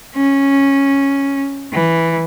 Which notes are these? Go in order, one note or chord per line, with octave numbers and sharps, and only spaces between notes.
C#4
E3